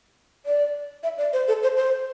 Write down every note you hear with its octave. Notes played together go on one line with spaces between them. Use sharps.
D5
E5
D5
C5
A4
C5
C5